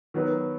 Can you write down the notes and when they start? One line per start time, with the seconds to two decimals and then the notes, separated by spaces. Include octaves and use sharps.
0.14 D#3 F#3 B3 F#4 B4